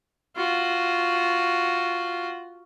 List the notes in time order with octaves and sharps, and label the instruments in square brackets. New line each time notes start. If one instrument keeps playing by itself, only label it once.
[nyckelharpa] F4 F#4